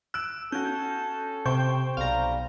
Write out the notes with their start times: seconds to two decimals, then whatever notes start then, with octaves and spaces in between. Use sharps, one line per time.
0.14 E6 F#6 D7
0.52 C#4 F#4 A4 G6
1.46 C3 C5 G5 C#6 G6
1.97 B1 G3 F5 A#5